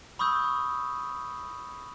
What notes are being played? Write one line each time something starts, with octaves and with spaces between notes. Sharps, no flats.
B5 C#6 D#6 E6 G6